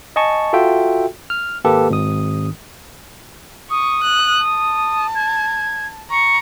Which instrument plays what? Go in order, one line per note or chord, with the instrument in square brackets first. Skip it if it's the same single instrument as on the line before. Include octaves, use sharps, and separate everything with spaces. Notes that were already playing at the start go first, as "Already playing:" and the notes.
[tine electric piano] D#5 G#5 A5 C#6
F4 F#4 A4 E5 G5
F6
G#1 A#3 G4 A4 B4
G#1 D#6
[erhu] C#6 [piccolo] D#6
[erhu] F#6
A5
[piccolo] G#6
[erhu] A#5 [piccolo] C#6